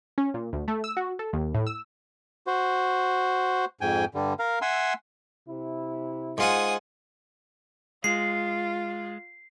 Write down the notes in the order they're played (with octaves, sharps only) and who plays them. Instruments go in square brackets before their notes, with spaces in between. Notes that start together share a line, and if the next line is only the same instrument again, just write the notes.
[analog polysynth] C#4
A#2
D2
A3
E6
F#4
A4
D#2
A2
E6
[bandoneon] F#4 C5
F2 G#2 G5 G#5
G2 D3 G3
A#4 F5
E5 F#5 G#5 C6 E6
[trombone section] C3 E4
[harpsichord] G#2 F4 F#5 [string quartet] G#5 D#6
[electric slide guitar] G#3 [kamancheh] F4 [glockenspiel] C7